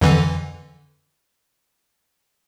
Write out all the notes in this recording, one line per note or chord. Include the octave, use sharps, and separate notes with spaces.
F2 D3 E3